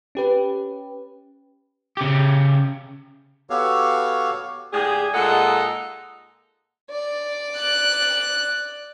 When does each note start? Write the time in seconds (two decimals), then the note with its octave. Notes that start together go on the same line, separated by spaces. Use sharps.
0.15 C#4 G4 B4
1.97 C#3 G4
3.50 B3 F#4 G4 A4 C#5 F5
4.72 A2 D3 G4 G#4
5.13 A#2 G#3 D#4 A4 F#5
6.90 D5
7.58 F#6